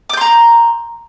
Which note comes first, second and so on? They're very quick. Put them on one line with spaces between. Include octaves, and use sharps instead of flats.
D6 G6 C6 A#5